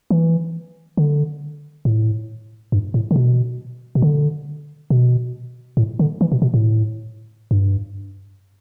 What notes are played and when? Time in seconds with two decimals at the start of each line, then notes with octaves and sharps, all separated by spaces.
0.11 E3
0.97 D3
1.85 A2
2.72 G2
2.94 A2
3.11 D3
3.16 B2
3.95 B2
4.02 D3
4.90 B2
5.77 A2
5.99 D3
6.21 E3
6.32 B2
6.42 B2
6.54 A2
7.51 G2